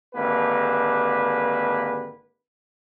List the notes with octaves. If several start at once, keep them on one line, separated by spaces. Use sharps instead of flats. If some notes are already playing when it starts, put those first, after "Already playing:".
G#1 D3 A#3 G4 B4